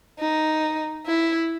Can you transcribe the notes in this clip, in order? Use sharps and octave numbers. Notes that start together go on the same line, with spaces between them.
D#4
E4